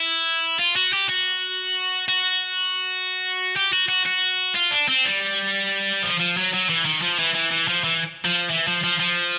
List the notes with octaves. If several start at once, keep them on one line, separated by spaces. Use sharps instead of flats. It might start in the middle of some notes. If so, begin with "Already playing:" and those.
Already playing: E4
F4
F#4
G4
F#4
F#4
G4
F#4
F#4
F#4
F4
D4
C4
G3
F3
F3
F#3
F#3
E3
D#3
F3
E3
E3
E3
F3
E3
F3
E3
F3
F3
F3